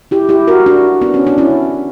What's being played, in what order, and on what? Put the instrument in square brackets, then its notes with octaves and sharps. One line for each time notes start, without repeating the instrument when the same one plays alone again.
[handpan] E4 G4
E4 G4
F#4 A#4
D4 F#4
B3 D4
C#4
D4
C#4 E4